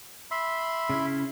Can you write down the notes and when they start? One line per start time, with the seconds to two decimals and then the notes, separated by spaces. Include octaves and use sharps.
0.31 E5 B5 C6
0.90 C#3 C#4 E4